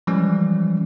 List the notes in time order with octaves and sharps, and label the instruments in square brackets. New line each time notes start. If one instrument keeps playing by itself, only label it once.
[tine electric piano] E3 F3 G3 G#3 C#4